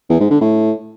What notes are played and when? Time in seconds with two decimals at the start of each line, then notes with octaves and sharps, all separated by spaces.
0.10 E2
0.20 G#2
0.30 D3
0.41 A2